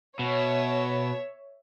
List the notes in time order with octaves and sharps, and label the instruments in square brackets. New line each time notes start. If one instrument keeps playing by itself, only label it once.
[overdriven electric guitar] B2 [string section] C#5 E5